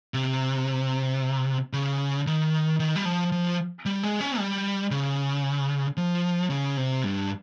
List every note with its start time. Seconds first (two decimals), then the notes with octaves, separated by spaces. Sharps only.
0.14 C3
1.73 C#3
2.27 D#3
2.80 D#3
2.96 G3
3.05 F3
3.32 F3
3.86 G3
4.03 G#3
4.21 C#4
4.38 G3
4.91 C#3
5.97 F3
6.50 C#3
6.77 C3
7.04 G2